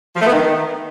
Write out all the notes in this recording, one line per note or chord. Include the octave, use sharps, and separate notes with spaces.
F3
A3
B3
D#3